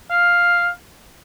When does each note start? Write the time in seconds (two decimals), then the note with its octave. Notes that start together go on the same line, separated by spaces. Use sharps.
0.11 F5